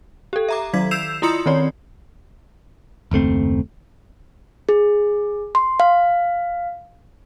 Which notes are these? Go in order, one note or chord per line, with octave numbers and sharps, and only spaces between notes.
G4 A4
E5 A#5 D6
D#3 F#3 G#6 B6
E6 G6 C7 E7 F7
E4 F4 A#5 C6 D#6 C#7
D#3 C4 C#5 D5
F#1 D#2 A3 C4
G#4
C6
F5